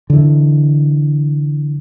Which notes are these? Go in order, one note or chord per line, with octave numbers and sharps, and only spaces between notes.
D3 E3